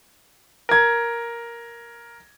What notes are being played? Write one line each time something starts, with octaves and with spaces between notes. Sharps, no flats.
A#4 G#6